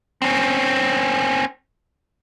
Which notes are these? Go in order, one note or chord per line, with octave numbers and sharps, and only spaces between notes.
C4 C#4